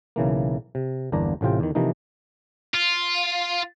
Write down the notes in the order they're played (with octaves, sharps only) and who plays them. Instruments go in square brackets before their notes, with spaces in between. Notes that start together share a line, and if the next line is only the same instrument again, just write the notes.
[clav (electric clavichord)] B1 C#3 E3 A#3
C3
G1 E2 A#3 D4 A#5
A1 A2 C3 F4 G5
E2 D#3
C3 E3 F3 A#3 D#4
[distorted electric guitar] F4